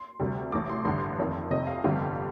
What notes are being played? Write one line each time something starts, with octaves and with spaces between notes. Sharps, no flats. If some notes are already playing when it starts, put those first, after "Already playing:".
Already playing: C6
D2 C3 G3
A1 A2 A3 D6
C6
A1 G2 D3 C6
C6
F1 F2 D#3
F1 F2 C3 D#5
F5
G1 F2 D3 G3 F5